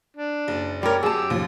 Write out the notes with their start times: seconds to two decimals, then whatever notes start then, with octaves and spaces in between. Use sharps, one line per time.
0.16 D4
0.48 F#1
0.83 G3 A#4 C#5 D5
1.03 F#2 G4 G#4 A5 D6 E6
1.30 D#2 F3